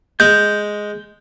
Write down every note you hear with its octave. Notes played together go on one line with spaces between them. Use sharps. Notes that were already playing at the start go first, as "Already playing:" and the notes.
G#3 G6